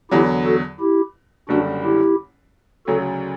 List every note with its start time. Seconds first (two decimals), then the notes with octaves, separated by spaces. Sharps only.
0.11 E2 D3 F#3 E4 G4
0.45 F#4 A4
0.80 E4 G4
1.49 F#1 F#2 D3 G3 D4 F#4
1.84 E4 G4
2.87 D2 C#3 F#3 F#4 A4